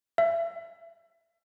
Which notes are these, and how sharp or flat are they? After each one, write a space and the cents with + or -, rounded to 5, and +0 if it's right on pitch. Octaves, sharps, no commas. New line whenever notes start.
E5 +30